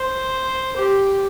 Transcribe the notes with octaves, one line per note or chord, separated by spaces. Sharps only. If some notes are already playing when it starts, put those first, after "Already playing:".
Already playing: C5
G4